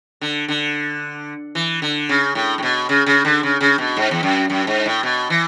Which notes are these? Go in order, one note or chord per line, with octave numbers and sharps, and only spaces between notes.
D3
D3
E3
D3
C#3
A2
A2
B2
C#3
C#3
D3
C#3
C#3
B2
G#2
E2
F#2
F#2
G#2
A2
B2
E3